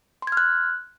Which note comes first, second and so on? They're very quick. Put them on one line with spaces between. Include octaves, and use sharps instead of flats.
C6 G#6 F6 F#6